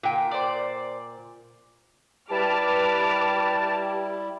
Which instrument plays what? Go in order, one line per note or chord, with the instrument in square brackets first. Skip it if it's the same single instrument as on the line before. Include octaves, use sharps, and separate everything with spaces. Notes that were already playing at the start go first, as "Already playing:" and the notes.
[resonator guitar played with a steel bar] A#2 G5
[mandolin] C5 D5
[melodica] G3 E4 [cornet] G4 [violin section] B4 D6 F6 [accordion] A5